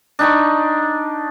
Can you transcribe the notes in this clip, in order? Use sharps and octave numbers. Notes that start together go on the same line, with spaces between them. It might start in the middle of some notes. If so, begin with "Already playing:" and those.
D4 D#4 B5 C#6